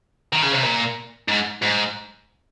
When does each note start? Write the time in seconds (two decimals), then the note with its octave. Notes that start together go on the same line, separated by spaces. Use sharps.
0.33 D#3
0.42 C#3
0.52 C3
0.63 A#2
1.28 G#2
1.62 G#2